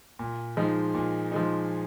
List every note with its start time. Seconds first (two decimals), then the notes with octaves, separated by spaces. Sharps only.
0.19 A#2
0.57 F3 G#3 D#4
0.94 A#2
1.32 F3 G#3 D#4